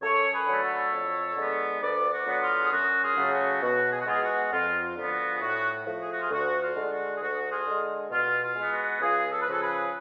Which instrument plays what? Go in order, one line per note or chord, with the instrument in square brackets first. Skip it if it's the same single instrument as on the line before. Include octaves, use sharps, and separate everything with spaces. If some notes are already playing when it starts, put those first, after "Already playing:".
[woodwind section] F#2 A4 C#5
G#4 B4
D3 F#3 A3
A4 C#5
F2
D3 G#3 B3
D2 B4 D5
F#4
D3 F#3 B3
F4
G#4
F#2 F#4
F4 G#4
C#3 F#3 A3
F#4
B2 F#4
G#4
F#4
G#3 B3 F4 G#4
F#4
F2 F4
F4
D3 F3 B3
F#4
G#4
A2 F#4
F3 A3
G#4
F#4
F4 G#4
D2 F#4
F4
D3 G#3
F#4
G#4
D2 F#4
F4 G#4
D3 G#3
B2 F4
F4
G#3 B3
F#4
C#2 F4 G#4
A4
B4
C#3 F3 F#4 A4
G#4 B4